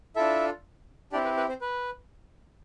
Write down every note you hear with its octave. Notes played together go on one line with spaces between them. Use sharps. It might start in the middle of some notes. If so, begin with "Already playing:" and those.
D4 E4 F4 A4 E5
C4 D4 E4 G4 D5
B4
B4
C4 C5
B4